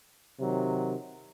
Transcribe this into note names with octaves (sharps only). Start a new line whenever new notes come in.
C3 D#3 F#3